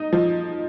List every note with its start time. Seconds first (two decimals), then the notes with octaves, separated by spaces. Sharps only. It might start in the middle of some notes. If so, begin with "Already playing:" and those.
Already playing: D#4
0.13 F3